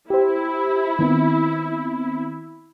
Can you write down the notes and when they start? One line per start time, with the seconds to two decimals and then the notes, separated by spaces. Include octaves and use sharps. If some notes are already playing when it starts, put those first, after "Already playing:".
0.10 E4 G4 C5
0.99 D#3 B3 C4